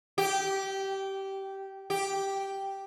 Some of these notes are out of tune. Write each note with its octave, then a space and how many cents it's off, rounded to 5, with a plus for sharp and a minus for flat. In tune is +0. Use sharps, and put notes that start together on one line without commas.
G4 -15
G4 -5